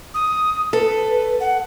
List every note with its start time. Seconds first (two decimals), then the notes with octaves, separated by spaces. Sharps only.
0.14 D#6
0.73 A4 B4
1.40 F#5